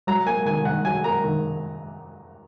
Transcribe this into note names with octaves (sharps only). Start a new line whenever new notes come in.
F#3 A#5
A#3 G#5
D#3 G#5
D#3 F#5
F#3 G#5
A#3 A#5
D#3